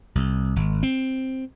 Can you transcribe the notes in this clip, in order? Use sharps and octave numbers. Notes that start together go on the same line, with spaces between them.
C2
G#1
C4